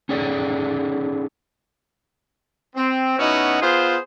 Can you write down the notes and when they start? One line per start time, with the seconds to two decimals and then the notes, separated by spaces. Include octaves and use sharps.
0.09 C#4 D#4 G#4 A4 D5 G5
2.76 C4
3.19 B2 B3 C#4 D#4 E4 F#4
3.62 B3 F4 G#4 C5